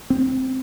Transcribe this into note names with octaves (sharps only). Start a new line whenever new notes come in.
C4